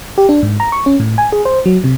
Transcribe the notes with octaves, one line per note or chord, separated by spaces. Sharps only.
G4
D4
G#2
A#5
C#6
C#4
A2
G#5
G#4
C5
F#3
C3